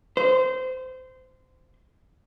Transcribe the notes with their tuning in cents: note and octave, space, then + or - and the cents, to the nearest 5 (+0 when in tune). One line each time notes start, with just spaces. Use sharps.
C5 -25